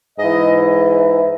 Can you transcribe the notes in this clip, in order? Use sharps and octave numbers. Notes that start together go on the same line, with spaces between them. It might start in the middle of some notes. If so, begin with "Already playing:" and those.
G#2 E3 D#5